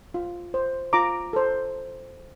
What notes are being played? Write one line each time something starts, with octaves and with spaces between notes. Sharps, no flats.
F4
C5
F4 A#5 D6
A4 C5